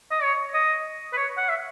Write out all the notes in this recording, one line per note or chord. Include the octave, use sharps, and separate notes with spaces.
D#5
C#5
D#5
B4
C#5
F#5
E5